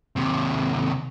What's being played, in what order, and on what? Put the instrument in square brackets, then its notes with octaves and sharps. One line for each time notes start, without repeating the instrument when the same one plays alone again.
[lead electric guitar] D#2 C3